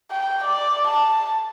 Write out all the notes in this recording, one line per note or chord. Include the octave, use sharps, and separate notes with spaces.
G5
D5
A5